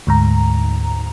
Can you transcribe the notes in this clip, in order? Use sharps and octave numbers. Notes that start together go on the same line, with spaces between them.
D2 G#2 A#5